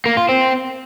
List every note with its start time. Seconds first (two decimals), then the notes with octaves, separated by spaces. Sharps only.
0.06 A#3
0.17 F4
0.29 C4